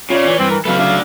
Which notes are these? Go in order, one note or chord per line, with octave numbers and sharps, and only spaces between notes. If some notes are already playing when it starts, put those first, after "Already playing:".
C#3 F4 C#5 D5
E3
G2 C4
A#4
C#3 F#3 A3 A4 B4 F5
D4 E5 F5